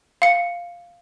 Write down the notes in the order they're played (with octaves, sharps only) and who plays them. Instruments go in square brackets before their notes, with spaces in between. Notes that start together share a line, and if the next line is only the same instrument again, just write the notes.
[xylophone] F5 C#7